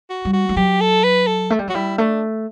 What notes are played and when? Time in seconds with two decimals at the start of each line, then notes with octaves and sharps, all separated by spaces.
0.10 F#4
0.25 G3
0.33 F#4
0.49 G3
0.56 F#3 G4
0.81 A4
1.04 B4
1.27 A4
1.50 A3
1.59 G3
1.67 F#3 F#4
1.75 G3 E4
1.98 A3 D4